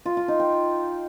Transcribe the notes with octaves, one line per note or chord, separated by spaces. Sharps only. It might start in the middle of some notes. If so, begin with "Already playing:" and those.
F4
F4
D#4
G5